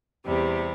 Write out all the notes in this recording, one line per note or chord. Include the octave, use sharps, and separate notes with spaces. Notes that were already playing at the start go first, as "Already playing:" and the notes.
E2 C3 G3